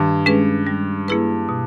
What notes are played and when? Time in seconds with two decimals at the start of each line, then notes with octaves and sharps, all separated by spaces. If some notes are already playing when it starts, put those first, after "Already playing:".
Already playing: G2 D#3
0.26 G#3 C#4 G#4 B4
0.67 G3
1.08 A#3 E4 G#4 B4
1.49 B2